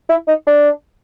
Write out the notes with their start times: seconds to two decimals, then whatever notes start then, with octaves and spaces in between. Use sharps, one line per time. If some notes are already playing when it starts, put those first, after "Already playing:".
0.09 E4
0.28 D#4
0.47 D4